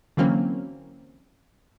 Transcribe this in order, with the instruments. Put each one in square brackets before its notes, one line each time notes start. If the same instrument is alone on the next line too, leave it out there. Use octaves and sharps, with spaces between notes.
[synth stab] D3 E3 F#3 A#3 C4 C#4